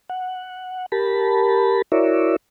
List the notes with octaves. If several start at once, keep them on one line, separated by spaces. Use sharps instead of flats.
F#5
G4 A#4 A5 B5
E4 F#4 A#4 C#5 D5 E5